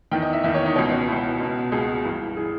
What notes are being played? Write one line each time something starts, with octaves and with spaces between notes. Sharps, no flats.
E2 D#3 G5
D#5
E5
E2 D#3 E5
C#5
D#4
C#2 B2 C#4
C#4
C#2 B2 E4
C#2 B2
C#2 B2 G#4
G2 E3
E3 G#4